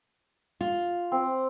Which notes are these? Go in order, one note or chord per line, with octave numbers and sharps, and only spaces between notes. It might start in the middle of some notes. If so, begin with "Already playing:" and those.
F4
C4